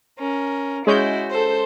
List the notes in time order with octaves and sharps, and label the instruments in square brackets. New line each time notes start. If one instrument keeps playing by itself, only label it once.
[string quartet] C#4 A#4
[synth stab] G#3 C#4 G6 [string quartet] E4 F#4
[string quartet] A4 C5 C6